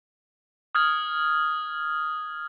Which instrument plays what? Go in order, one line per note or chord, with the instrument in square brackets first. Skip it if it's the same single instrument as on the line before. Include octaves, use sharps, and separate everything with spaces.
[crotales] D#6 F6 G#6